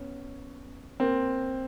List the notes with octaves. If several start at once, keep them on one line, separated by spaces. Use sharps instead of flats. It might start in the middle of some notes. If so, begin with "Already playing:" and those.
Already playing: B3 C#4
A#3 C4